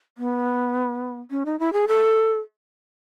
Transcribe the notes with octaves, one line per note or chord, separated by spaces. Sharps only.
B3
C#4
D#4
E4
G#4
A4